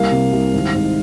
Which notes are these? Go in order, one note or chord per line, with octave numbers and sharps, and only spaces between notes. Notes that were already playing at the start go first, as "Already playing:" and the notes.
Already playing: C2 A#3 F5
C3
C2
G#1
G#2